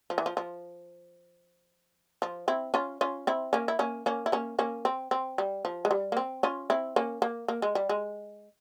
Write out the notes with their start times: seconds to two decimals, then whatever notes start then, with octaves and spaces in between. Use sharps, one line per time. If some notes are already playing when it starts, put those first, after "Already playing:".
0.10 F3
0.18 E3
0.26 F3
0.37 F3
2.22 F3
2.48 C4 E4
2.74 C#4 F4
3.01 C#4 F4
3.27 C4 E4
3.53 A#3 C#4
3.68 E4
3.79 A#3 C#4
4.06 A#3 C#4
4.26 E4
4.32 A#3 C#4
4.59 A#3 C#4
4.85 C4
5.11 C4
5.38 G3
5.65 F3
5.85 G#3
5.91 G3
6.12 A#3
6.17 C4
6.43 C#4 F4
6.70 C4 E4
6.96 A#3 C#4
7.22 A#3
7.48 A#3
7.62 G#3
7.75 G3
7.89 G#3